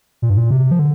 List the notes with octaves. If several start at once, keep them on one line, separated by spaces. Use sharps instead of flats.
A#2
G2
A#2
C3
F3
D3